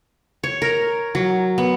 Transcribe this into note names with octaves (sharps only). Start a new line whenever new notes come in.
C#5
A#4
F#3
B3